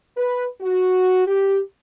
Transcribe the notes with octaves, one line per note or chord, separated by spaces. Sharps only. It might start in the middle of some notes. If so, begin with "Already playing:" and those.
B4
F#4
G4